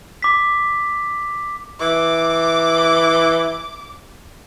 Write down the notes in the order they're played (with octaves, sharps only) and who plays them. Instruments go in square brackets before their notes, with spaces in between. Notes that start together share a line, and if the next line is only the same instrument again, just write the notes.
[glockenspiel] D6 B6
[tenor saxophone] E3 [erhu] D6